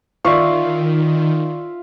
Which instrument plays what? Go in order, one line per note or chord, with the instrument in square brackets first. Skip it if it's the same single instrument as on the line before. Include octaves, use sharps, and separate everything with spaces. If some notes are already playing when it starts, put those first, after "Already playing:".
[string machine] D#3 [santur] F4 E5 F5 [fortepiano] D5 C#6